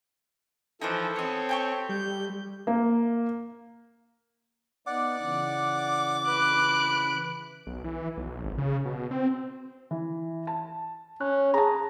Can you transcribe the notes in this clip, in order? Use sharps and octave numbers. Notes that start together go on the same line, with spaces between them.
E3 F3 D#4 A4 A#4 C5
B3 C4 C#5 D#5
G4 G5 C#6
G3 G6
A#3
B3 D#4 D5 F#5 D6
C#3 E3
B4 F#6 D7
B1
E3
B1
G#1
C#3
B2
C4
E3
A5
C#4 F#6
G#4 A5 A#5